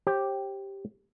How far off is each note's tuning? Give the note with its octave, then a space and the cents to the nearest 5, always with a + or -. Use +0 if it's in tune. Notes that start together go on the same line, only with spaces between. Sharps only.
G4 +0 C5 +45